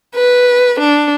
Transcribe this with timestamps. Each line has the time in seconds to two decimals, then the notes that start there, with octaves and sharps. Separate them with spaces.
0.15 B4
0.80 D4